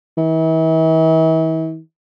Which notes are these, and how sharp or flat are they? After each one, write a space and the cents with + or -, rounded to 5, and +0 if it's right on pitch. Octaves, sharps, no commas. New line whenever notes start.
E3 -40